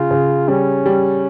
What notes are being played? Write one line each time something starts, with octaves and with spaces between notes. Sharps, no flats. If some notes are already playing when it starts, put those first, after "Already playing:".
Already playing: C#3 F4
C#3
G3 C#4
G3